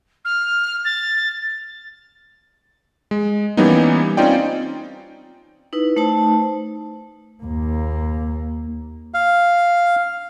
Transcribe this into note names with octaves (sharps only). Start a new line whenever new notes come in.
F6
A6
G#3
E3 G3 A#3 B3 C#4 D#4
C4 C#4 D#4 F4 D5 G5
D#4 E4 B4
A3 D#4 C5 A5
D#2 A#3
F5